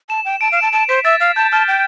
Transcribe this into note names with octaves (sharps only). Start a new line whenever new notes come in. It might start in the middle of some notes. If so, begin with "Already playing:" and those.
A5 E7
G5
A5 D7
F5
E7
A5
A5 D7
C5 B6
E5 A6
F5
A5 G6
A5 F6
G5